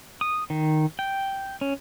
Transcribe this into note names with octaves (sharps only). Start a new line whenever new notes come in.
D#6
D#3
G5
C#4